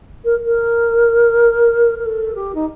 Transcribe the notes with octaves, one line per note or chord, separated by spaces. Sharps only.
A#4
A#4
A#4
A4
G4
D#4